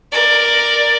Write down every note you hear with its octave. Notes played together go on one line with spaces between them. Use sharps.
A#4 D5